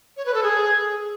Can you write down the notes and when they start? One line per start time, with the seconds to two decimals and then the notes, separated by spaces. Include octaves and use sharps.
0.17 C#5
0.26 B4
0.34 A4
0.43 G#4